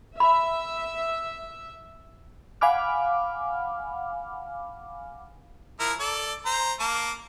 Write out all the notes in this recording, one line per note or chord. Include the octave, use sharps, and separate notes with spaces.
E5 B5
F5 F#5 G#5 B5 D6 F6
F3 E4 A#4
A4 D5
C5 A#5
A#3 A5